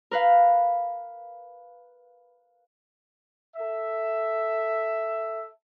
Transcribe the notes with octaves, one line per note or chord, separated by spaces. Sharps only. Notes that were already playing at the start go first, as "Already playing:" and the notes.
A#4 B4 F5
A4 E5